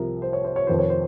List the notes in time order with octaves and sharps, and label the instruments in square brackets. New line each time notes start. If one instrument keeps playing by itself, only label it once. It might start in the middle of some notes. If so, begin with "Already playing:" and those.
Already playing: [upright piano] C2 C3 F3 A#4
C5
C#5
C5
C#5
F1 F2 D#3 C5
C#5
C5